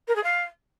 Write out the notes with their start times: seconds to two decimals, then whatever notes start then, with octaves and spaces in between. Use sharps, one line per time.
0.07 A#4
0.15 G#4
0.23 F5